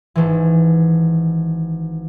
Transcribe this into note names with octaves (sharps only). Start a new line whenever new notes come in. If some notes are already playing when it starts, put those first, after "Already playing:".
G#1 E3